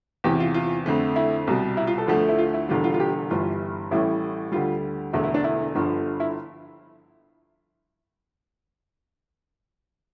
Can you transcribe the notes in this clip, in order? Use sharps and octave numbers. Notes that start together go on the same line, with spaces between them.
E2 C3 E3 G4
F4
F4
F2 D3 A3
E4
C2 B2 G3
E4
F4
A4
D2 D3 F3 A3
E4
F4
E4
E1 E2 D3 G3 F4
F4
F4
G4
G1 G2 E3 G3 F4
A1 A2 E3 G3 E4
D2 D3 G3 F4
E1 E2 D3 A3 E4
E4
D4
E4
G1 G2 D3 F3
E4